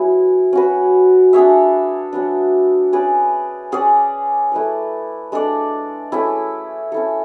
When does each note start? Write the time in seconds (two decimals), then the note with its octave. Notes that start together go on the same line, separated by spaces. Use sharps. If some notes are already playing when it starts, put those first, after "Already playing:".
Already playing: F#3 B3 E4 G#4
0.53 C#4 F#4 B4
1.33 D4 G#4 C#5 E5
2.13 F#3 B3 D4
2.93 C#4 G#4 B4 D5
3.72 C#4 G#4 D5
4.52 A3 E4 B4 D5
5.32 G#3 D4 A4 D5
6.12 A3 C#4 E4 G#4
6.92 C#4 E4 A4